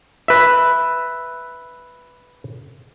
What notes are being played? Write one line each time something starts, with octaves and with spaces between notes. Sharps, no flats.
B4 E5